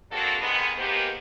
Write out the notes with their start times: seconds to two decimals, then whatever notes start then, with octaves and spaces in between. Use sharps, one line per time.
0.12 A#3 C4 D4 F#4 G#4 A4
0.41 G#2 C3 D#3 G#3 B3
0.77 D#3 G#3 A#3 B3 G4 C5